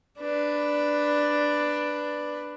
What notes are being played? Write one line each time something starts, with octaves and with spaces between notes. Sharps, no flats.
D4 B4